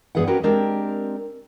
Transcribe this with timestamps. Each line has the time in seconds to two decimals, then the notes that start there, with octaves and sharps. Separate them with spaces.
0.15 G2 B3 G#4 B4 E5 F#5
0.27 G3 C#4 F#4 G4 A#4 B4
0.43 G#3 C4 D4 G4 A#4